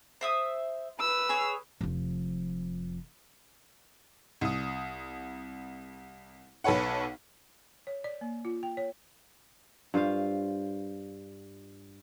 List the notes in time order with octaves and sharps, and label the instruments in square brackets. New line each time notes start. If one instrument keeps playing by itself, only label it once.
[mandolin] C5 E5 D#6
[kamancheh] B4 E6
[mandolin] G#4 C#5
[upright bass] F1 F3
[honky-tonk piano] C2 D#6
B1 A4 B4 C#5 F#5
[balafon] C#5
D5
A#3
F4
G5
C#5
[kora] G2 F4 C5 F5